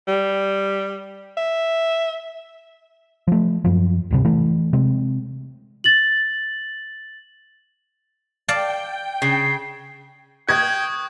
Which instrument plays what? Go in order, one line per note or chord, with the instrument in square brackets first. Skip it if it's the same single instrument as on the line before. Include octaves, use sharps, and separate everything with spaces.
[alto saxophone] G3
E5
[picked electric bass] F3 A3
F#2 F3
D1 G2 C3
E3 A3
C3 G#3 C4
[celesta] A6 F#7
[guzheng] D5 F5 A5 [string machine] G5
[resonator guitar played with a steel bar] C#3 [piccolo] C7
[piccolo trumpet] G5 [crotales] C#6 D#6 F#6 [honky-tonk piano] G#6